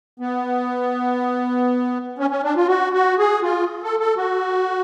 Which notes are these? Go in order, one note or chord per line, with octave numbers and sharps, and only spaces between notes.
B3
C#4
C#4
D4
F4
F#4
F#4
G#4
F4
A4
A4
F#4